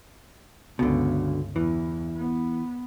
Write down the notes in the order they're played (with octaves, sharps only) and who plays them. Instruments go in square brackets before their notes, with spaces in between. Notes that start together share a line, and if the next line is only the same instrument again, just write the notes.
[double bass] G1 C#2 [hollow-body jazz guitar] B2 D3
[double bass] E2 [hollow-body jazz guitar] E3
[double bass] B3